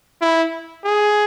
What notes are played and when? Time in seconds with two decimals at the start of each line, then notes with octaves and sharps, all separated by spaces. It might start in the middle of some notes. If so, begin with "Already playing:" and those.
0.22 E4
0.84 G#4